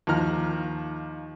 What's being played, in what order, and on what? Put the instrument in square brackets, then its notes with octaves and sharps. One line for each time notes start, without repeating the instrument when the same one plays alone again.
[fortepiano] D#2 F3 A#5 F6